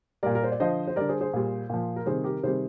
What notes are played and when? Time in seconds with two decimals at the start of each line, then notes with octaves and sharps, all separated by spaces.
0.23 A#2 G3 A#4 D5
0.35 A#4
0.44 C5
0.52 D5
0.60 D3 F3 C5 D#5
0.87 C5
0.96 D3 G3 A#4 D5
1.09 G#4 C5
1.20 G#4 C5
1.33 A#2 G3
1.70 A#2 F3
1.96 A#4
2.06 C3 D#3 G3 G#4 C5
2.24 G4 A#4
2.43 C3 D#3 G3 G#4 C5